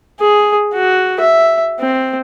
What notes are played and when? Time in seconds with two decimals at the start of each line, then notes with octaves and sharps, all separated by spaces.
0.19 G#4
0.74 F#4
1.20 E5
1.80 C4